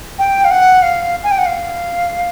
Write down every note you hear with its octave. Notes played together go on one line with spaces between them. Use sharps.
G5
F5
F#5
F5
G#5
G5
F#5
F5